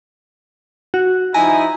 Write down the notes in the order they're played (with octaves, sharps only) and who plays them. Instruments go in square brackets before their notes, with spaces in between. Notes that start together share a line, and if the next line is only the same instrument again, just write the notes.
[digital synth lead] F#4
[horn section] F3 D#4 E4 [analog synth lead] G#5 [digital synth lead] A#5